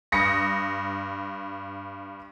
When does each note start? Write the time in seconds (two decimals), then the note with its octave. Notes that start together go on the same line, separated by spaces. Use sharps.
0.12 G2 D#6 A#6 C#7